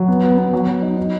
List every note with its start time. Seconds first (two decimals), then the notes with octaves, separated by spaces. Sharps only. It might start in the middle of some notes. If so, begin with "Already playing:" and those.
Already playing: F#3
0.08 B3
0.23 B3
0.38 B3
0.53 F#3
0.67 F#3
0.82 D#4
0.97 D#4